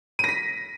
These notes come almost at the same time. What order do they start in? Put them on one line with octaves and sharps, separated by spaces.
D#7 A#6 B6